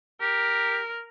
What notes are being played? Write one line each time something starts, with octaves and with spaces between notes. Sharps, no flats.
G4 A#4